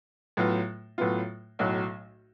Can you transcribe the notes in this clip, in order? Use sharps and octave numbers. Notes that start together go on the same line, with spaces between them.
A2 F#3 B3 F4
A2 F#3 B3 F4
B1 A2 F#3